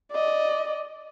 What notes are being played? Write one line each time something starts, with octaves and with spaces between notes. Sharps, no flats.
D5 D#5